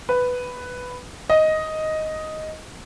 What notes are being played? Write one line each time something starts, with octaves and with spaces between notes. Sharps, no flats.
B4
D#5